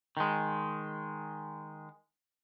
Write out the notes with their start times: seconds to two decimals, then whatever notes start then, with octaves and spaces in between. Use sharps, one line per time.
0.17 D#3 G#3